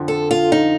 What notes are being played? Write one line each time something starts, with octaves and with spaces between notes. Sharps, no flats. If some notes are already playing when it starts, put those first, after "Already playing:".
Already playing: F2 D3 F3
A4
F4
D#4